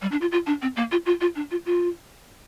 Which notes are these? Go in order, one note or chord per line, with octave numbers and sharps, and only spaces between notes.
G3
D4
F4
F4
D4
C4
A#3
F4
F4
F4
D4
F4
F4